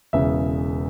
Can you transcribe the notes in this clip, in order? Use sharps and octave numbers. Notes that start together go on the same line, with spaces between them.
E1 E2 C#3 E5